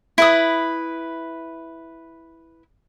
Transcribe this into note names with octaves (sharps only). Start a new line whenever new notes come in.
E4 B4 D#6